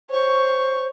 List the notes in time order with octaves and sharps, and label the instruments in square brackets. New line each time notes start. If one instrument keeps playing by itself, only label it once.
[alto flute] C5 [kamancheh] C#5 C#6